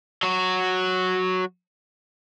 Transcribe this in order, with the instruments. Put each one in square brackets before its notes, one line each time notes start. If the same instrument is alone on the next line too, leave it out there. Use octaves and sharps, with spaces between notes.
[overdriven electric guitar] F#3 F#4